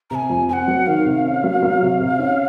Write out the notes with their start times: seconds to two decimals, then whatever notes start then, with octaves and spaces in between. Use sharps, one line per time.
0.10 C3 G#5 A#5
0.30 F2
0.49 C4 F#5 G#5
0.68 F#3
0.86 D#3 F5
1.06 C3
1.25 C#4
1.44 F#3
1.63 F#3
1.81 C3
2.00 C3
2.19 C#4